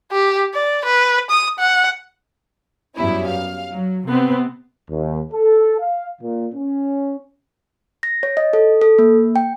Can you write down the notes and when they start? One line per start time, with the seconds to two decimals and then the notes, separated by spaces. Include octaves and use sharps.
0.12 G4
0.54 D5
0.85 B4
1.30 D#6
1.59 F#5
2.97 F#2 G3 B3 C#4 E4
3.28 F5
3.72 F#3
4.07 C3 B3 C4
4.90 D#2
5.32 A4
5.80 F5
6.22 A#2
6.55 C#4
8.03 A#6
8.23 C#5
8.37 D#5
8.53 A4
8.81 A4
8.99 A#3
9.36 G5